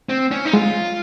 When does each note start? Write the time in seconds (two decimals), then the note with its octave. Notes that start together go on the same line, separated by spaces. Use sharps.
0.09 C4
0.31 C#4
0.45 D#4
0.53 G#3 F4